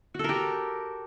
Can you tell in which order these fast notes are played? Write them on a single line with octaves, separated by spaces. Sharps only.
F#4 A4 A#4 G4